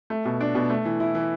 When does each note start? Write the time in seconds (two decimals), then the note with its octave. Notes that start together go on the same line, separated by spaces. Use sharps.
0.10 A3
0.25 B2
0.41 D4
0.55 B2
0.70 A3
0.85 E3
1.00 E4
1.15 E3